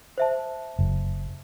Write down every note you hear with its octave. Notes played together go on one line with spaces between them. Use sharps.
C5 E5 A5
F#1